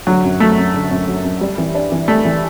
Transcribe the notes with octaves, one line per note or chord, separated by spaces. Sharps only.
D3 F#3
F#2
F#3 A3
F#2
D3
F#2
F#3
F#2
G3
E3
D4
E3
G3 A3
E3